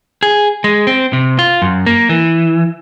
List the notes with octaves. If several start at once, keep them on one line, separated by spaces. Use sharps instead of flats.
G#4
G#3
C4
C3
F4
F#2
A#3
E3